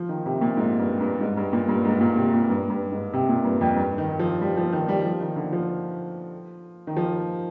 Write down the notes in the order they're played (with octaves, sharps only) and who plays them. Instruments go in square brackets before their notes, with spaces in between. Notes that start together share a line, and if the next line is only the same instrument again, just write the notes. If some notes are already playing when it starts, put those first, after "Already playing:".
Already playing: [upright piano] F3
D#3
C3
A#2
G#2
G2
G2
G#2
G2
A#2
G2
G#2
A#2
C3
A#2
G2
G2
G#2
C3
A#2
G2
F2
G2
D#3
F3
G3
F3
D#3
G3
F3
D#3
D3
F3
D#3
F3